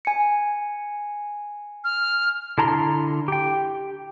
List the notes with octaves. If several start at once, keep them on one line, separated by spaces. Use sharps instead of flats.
G#5 C#7
F6
D3 E4 A5 A#5 C6
G4 G5